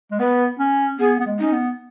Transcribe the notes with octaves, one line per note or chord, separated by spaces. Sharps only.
G#3
B3 B4
C#4
B3 G#4
B3
G#3
C#4 D#4
B3